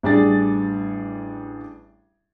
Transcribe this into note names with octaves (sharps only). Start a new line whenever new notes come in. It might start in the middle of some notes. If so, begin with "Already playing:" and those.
A1 G3 D4 G#4 A6